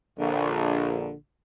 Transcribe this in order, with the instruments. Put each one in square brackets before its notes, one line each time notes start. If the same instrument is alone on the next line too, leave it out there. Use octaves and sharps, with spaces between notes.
[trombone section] A#1 [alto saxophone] D3